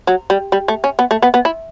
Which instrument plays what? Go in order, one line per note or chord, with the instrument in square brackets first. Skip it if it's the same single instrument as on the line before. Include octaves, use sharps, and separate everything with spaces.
[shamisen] F#3
G3
G3
A3
C#4
B3
A3
B3
B3
E4